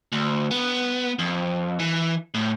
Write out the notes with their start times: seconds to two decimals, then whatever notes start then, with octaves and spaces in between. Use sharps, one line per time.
0.12 D2
0.51 B3
1.19 F2
1.79 E3
2.34 A2